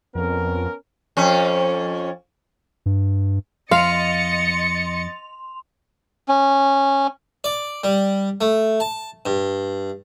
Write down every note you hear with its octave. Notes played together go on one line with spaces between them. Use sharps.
F2 B3 C#4 A#4
F2 C#4
G2
F2 D#5 F5 C6 A6 C#7 F7
C#4
D5
G3
A3
A5
G2